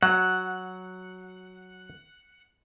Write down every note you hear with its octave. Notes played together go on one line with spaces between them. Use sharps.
F#3 F#5